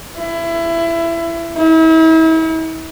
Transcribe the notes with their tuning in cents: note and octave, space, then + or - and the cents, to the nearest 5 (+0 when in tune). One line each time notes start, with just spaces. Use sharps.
E4 +20
E4 -40